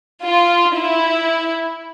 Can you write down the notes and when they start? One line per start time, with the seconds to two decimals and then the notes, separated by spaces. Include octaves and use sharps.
0.25 F4
0.77 E4